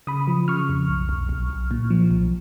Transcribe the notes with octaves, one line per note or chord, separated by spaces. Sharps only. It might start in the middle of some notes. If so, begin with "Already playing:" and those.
C#3 B5 D#6
F3
C#3 C#6 F6
F2
B1
B1
B1
B1
A#2
F3
B1